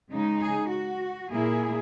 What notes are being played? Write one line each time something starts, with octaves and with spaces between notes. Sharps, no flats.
C#3 G#3 D#4
G#4
F#4
A#2 A#3 E4 G#4